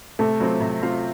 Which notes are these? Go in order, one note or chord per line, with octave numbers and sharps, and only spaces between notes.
C3 A3
F#3 C4 F4 C5
C3
F#3 C4 F4 C5